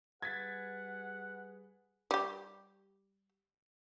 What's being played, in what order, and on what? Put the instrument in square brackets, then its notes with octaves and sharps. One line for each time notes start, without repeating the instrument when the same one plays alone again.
[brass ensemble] G3 G#4 B4 [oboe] F#5 [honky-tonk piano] G#6 A6 B6
[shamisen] G3 G4